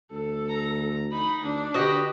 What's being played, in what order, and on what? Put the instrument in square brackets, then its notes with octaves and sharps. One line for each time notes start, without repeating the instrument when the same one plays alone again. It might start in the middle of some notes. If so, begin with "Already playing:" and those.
[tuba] D2 [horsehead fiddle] A4
[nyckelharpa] A#5
[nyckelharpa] D#4 [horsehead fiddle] B5
[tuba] D2 [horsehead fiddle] D4
[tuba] D3 [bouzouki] F#4 D#5 [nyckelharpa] G4 B4